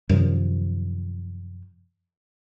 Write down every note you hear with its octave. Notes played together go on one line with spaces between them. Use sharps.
F#2 C3 D#3 F3